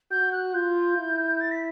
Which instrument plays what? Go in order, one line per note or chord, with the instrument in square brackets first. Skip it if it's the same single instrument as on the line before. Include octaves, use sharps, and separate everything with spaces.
[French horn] F#4 [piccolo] G6
[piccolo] F#6
[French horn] F4 [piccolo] G6
[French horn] E4
[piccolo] A6
B6